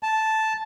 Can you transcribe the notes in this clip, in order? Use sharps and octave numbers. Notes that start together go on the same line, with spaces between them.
A5